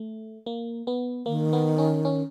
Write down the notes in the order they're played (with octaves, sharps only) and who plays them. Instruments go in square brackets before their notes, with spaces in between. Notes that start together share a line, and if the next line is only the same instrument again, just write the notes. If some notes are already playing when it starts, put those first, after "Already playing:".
Already playing: [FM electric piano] A3
A#3
B3
[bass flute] D#3 [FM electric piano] A#3
[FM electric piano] B3
C#4
C#4